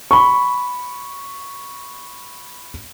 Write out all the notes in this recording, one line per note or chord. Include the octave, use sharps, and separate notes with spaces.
B5 C#6